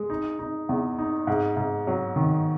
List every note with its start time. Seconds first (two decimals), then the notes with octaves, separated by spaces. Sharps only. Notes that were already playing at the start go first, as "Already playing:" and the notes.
Already playing: G#3
0.10 D#4
0.39 D#4
0.69 E2
0.99 D#4
1.27 G#2
1.57 G#2
1.87 F#3
2.16 D#3